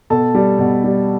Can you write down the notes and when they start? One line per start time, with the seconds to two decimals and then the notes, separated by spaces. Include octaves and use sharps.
0.10 B2 A4 A5
0.35 G3
0.59 B2
0.84 G3